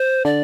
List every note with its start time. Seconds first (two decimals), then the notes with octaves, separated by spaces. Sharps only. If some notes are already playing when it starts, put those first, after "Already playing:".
Already playing: C5
0.25 D3 D5